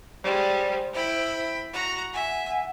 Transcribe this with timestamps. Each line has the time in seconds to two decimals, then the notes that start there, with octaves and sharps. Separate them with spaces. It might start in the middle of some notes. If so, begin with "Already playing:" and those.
0.24 G3 G#3 C5
0.94 E4 G5 B5
1.74 F#4 A#5
2.14 E5 F#5 G#5